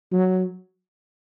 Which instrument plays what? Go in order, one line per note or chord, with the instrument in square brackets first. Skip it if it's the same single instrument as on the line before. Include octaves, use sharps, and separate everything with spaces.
[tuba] F#3